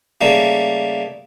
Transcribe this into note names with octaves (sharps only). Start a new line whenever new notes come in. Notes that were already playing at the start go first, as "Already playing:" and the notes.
C#3 G3 A3 A#3